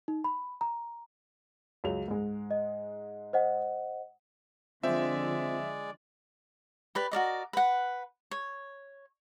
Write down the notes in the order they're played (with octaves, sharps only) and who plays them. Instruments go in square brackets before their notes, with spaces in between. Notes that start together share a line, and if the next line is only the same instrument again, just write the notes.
[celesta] D#4
B5
A#5
[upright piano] C#2 F#3 F7
G#2 G#3
[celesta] D#5
C5 D#5 F#5
[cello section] D3 F3 [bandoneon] G#3 D5 [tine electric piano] C4 F4 C5 [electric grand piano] E5
[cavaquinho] G4 B4 D5
F#4 A#4 D5 D#5
B4 F#5
C#5